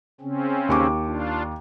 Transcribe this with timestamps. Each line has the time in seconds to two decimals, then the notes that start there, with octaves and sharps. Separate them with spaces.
0.21 C#3 C4 C#4
0.69 D#2 C#6 D6
1.06 D4 F4